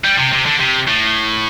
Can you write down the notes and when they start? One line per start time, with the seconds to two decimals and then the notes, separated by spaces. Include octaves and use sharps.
0.05 G3
0.19 C3
0.33 C3
0.46 D3
0.60 C3
0.88 A2